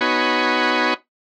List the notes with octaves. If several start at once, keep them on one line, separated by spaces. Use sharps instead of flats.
B3 D#4 F#4 C#5 G#5 B5